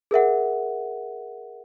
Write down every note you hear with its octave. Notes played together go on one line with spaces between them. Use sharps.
G#4 A#4 E5 F#5